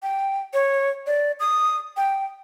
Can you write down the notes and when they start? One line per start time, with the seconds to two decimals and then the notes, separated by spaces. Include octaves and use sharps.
0.03 G5
0.54 C#5
1.07 D5
1.40 D#6
1.97 G5